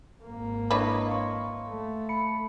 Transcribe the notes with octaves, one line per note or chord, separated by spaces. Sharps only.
G#1 A#3
D4 E4 B4 C#5 D#5 C#6
F5 C6 C#6
A3
B5 C#7